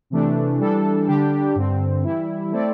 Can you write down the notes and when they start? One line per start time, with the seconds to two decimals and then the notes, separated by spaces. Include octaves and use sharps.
0.10 C3 E3 A3 D4
0.59 E3 G3 D4 A4
1.07 D3 G3 D4 G4
1.55 G2 D3 C4
2.03 E3 G3 E4
2.52 A3 C4 E4 A4 D5